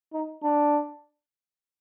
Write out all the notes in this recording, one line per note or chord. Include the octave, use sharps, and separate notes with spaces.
D#4
D4